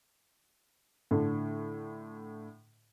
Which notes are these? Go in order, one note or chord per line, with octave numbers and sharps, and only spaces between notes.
A2 D3